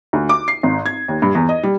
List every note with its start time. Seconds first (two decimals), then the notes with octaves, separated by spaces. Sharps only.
0.13 D2
0.29 D6
0.48 C7
0.63 G#1
0.86 G#6
1.08 D#2
1.22 G2
1.35 E2
1.49 D#5
1.63 G3